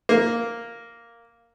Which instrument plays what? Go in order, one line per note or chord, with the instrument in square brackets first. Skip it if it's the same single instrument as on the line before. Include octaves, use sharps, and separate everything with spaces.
[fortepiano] A#3